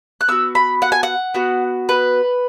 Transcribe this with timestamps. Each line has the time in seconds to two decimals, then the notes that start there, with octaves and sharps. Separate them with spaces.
0.21 F#6
0.28 B3 F#4 E6
0.55 B5
0.82 F#5
0.92 G#5
1.03 F#5
1.34 B3 F#4
1.89 B4